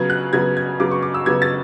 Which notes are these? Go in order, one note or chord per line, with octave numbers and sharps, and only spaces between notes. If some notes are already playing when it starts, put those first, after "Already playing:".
Already playing: C#3 F#3 B3 G#6
F#6
C#3 F#3 B3 G#6
G#6
C#3 F#3 B3 D6
C#6
D6
E6
C#3 F#3 B3 G#6
A6